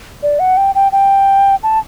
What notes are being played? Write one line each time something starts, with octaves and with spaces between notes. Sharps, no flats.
D5
F#5
G5
G5
G5
A5